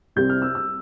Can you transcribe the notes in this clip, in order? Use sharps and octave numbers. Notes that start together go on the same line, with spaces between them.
C2 C3 G3 C4 G6
F6
E6
E6